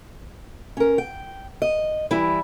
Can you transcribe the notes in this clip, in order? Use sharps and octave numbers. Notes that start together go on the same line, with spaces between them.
C#4 A#4
G5
D#5
E3 G3 E4